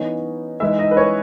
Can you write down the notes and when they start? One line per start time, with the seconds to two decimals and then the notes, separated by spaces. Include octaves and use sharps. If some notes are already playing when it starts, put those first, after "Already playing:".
Already playing: E3 B3 C#4 D#4 C#5
0.60 E3 G#3 D#4 E4 E5
0.79 D#4 D#5
0.91 B4
0.97 C#4 C#5